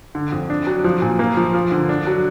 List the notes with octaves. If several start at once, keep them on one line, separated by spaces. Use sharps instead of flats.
D3
F2
D4
F#3
F3
A#2
A#3
F3
F3
D3
D4
F#3